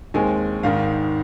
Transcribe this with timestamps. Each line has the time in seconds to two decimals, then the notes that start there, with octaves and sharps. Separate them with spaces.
0.14 D#2 D#3 G#3 C4 G#5
0.63 G#1 G#2 D#3 F5